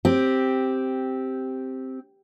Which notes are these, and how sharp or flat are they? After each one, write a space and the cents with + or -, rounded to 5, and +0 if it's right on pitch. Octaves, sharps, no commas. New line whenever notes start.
C4 +0 G4 +0